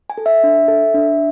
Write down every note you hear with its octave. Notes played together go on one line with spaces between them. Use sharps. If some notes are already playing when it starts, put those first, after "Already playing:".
G#5
A4
E5
D4
A4
D4